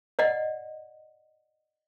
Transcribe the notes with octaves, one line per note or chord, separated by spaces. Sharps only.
D5 D#5 F#5